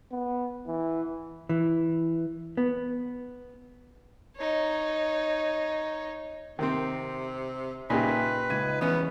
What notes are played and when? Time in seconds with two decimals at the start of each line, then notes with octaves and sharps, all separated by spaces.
0.12 B3
0.67 E3
1.49 E3
2.57 B3
4.36 D#4 C#5
6.59 C3 D#3 C4
7.90 A#2 C#3 D#4 G4 B4 E5 G#5
8.50 C#2 D#4 G#6 D#7
8.81 E2 B3 C#4